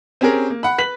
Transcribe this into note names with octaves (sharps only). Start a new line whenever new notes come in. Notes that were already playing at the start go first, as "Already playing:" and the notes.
C4 C#4 G4 G#4 A#4
A#3
F#5 B5
B4 B6 F#7